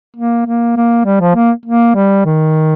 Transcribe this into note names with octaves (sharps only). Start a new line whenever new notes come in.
A#3
A#3
A#3
G3
F3
A#3
A#3
G3
D#3